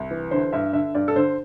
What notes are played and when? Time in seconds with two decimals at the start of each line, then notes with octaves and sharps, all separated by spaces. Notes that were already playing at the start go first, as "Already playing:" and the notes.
Already playing: C2
0.11 E3
0.31 D3 C5
0.53 G2 E5
0.73 D3 E5
0.95 G2 D5
1.08 A4
1.16 D3 C5